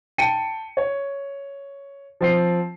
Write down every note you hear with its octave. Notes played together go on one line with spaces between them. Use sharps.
G5 A5 C#7 D#7
C#5
F3 C4 C7